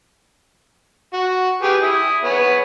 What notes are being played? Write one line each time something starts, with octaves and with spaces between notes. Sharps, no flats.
F#4
G4 G#4 B4
E4 D#6
B3 G#4 C#5